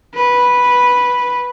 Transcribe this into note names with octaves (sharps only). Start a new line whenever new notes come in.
B4